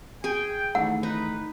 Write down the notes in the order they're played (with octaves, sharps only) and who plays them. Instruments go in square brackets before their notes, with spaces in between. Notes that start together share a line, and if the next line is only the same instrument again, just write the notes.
[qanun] G#4 G#5 [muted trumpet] G5
[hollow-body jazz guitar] D#3 E3 A3 [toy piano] F#5
[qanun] D#4 [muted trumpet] B4